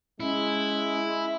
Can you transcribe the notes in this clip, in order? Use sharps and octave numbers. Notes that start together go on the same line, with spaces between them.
G#3 C#4 E4